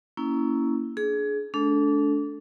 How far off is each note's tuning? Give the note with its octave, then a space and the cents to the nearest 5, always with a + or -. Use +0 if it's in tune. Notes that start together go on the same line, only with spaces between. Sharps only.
A#3 +0 C#4 +15 E4 +0
D4 -10 G#4 +25
A3 -40 D4 -25 A4 +0